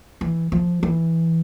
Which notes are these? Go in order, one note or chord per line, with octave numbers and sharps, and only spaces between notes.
E3
F3
E3